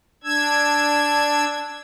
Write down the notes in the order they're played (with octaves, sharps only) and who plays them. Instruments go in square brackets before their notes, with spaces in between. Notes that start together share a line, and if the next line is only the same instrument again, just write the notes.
[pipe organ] D4 E6 G#6